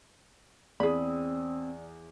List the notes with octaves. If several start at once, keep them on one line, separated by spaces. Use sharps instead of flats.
E2 C4 G#4 D5 B5 D#6